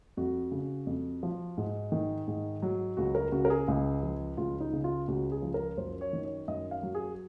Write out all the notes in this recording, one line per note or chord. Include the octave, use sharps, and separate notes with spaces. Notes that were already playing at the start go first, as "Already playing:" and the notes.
F2 F#4
C#3
F2
F3
G#2
D#3
G#2
F#3
C#2 F#4
A#4
C#3 F#4
A#4
G#4
C#2
F3
C#2 F4
D#4
C#3
F4
C#2 F#4
G#4
F3
A#4
F#2 C5
C#5
D#3
C#5
F#2 D#5
F5
F#3
G#4